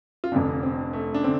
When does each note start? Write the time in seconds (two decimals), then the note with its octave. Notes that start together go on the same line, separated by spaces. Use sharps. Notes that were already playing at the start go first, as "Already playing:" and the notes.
0.24 F4
0.32 F1 F2 D3 D4
0.63 C4
0.93 A3
1.14 D4
1.24 D3 C4